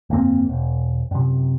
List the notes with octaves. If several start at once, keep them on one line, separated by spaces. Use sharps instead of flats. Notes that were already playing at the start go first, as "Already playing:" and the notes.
G1 F2 A#3 C4
E1
F#2 C3